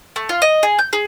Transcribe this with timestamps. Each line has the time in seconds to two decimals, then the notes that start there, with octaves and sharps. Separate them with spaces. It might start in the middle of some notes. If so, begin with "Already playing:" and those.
0.16 A3
0.29 F4
0.42 D#5
0.63 G#4
0.79 G6
0.93 G#4